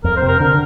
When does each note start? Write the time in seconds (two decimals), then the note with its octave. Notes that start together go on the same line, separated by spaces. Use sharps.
0.04 F2 A#4
0.17 C5
0.22 C3
0.28 A#4
0.40 D3 A#4